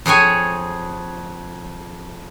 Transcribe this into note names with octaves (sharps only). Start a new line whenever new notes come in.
F2 G#4 C#5 G#5